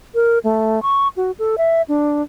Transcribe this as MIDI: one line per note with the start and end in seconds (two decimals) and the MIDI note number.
0.15 0.39 70
0.44 0.82 57
0.82 1.08 85
1.17 1.31 66
1.39 1.56 69
1.58 1.82 76
1.88 2.22 62